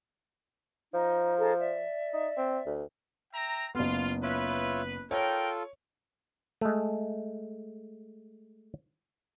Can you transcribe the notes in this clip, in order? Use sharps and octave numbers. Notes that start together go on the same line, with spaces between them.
F3 D#4
D#4 G#4 A4
D5 E5
D#4
C4
D2
E5 G5 A#5
F#1 B3 F4
F4 B4 C#5 E5
D#4 F4 A4 A#4 C#5 G5
G#3 A3